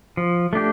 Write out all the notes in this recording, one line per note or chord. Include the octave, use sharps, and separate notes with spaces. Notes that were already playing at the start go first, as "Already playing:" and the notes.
F3
A3 D4 G4